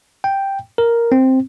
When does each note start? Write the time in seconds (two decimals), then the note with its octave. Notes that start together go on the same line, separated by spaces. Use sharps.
0.24 G5
0.78 A#4
1.12 C4